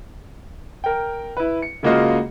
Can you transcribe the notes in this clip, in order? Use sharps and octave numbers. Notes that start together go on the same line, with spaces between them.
A#4 G5
E4 B4
C#7
C#3 G#3 A#3 F4 F#4 D#5